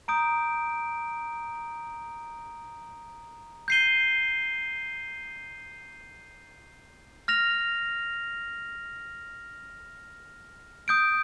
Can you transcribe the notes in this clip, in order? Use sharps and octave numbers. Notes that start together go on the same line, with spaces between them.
A#5 D#6 G6 D7
G6 C7 D#7 G7
F6 A#6 F7
D#6 G6 D7